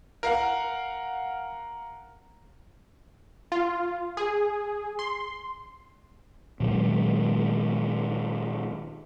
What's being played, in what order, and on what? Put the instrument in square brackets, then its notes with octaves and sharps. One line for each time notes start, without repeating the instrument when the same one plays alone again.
[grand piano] A#4 F5 F#5
[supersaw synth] F4
G#4
C6
[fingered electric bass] A#2 D#3 F#3 G#3